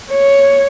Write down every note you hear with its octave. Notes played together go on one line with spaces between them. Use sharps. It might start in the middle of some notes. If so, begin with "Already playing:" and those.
C#5